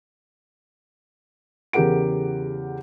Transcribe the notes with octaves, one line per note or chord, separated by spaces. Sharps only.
E2 C#3 G4 A#4 F#5 D7